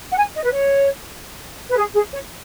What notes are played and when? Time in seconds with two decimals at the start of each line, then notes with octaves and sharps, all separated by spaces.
0.12 F#5
0.18 G#5
0.35 D#5
0.45 B4
0.53 C#5
1.71 B4
1.77 G#4
1.95 G#4
2.13 C#5